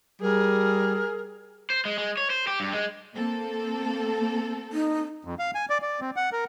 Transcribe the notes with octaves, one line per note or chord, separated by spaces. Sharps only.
G3 G#4 A#4
C5
G#3
G#3
C#5
C5
G4
G2
G#3
A#3 C4 A4
D#4
F2
F5
G#5
D5
D5
C4
F#5
A#4